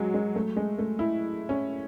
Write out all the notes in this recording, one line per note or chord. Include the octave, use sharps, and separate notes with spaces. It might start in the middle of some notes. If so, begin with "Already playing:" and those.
Already playing: F#3 G#3
G#3
A3
G#3
A3
E4
C#4